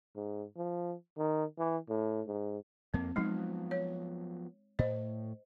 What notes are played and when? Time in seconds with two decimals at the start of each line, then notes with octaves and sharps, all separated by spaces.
0.16 G#2
0.57 F3
1.18 D#3
1.59 E3
1.89 A2
2.27 G#2
2.94 F2 A#3 C4
3.16 F3 F#3 G#3 B3 D#4
3.71 C#5
4.79 A2 C5 D#5